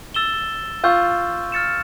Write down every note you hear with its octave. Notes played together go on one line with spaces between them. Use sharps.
E6 A6 E7 G7
F4 C#6 E6 G6
F6 A6 C#7 E7